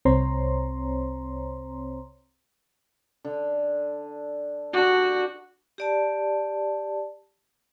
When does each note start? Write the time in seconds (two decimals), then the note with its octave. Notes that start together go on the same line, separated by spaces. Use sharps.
0.05 C2 C4 C5 C#5 A#5 C6
3.24 D3
4.73 D4 F#4 G4
5.78 G4 D5 A5